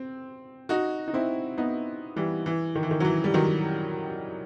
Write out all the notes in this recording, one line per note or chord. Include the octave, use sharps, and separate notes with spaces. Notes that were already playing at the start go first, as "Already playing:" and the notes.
Already playing: C4
D#4 F#4
D#4
C4 E4
B3 D#4
E3 G3
E3
D#3
E3
D#3
F#3
E3
G3
D#3 F#3